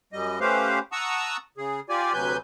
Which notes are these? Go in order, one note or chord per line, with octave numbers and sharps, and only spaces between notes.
F#2 G3 D#5
A3 C#4 G4 B4 C5 F5
F#5 A5 A#5 C#6 D#6 E6
C#3 G#4
F4 G4 D5 G#5
D2 C3 F#3 B4 G#5 G6